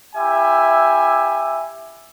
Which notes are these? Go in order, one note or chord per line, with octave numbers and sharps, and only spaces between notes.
E4 G4 E5 G#5